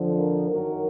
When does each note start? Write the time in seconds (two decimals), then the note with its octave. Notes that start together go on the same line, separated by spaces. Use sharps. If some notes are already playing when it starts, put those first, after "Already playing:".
Already playing: F2 D3 F3
0.18 A#4
0.49 F#2 D#3 F#3 A#4